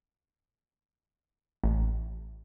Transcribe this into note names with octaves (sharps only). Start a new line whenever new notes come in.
A1